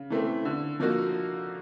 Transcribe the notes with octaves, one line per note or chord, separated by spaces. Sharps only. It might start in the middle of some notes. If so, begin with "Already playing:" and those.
Already playing: C#3
E3 A3 C4
D3
F3 A#3 D#4 F#4